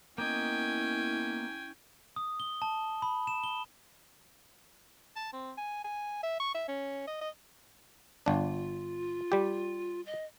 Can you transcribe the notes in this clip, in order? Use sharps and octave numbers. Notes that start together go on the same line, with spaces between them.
A#3 B3 C#4 E4 D#5 G5 G#5
D#6
G7
A5
B5
E7
G7
A5
C4
G#5
G#5
E5
C#6
E5
C#4
D#5
D#5
G1 D4 F4
G3 G4
D#5